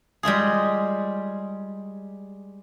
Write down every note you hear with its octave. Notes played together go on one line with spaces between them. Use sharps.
G3 G#3 F4 G#4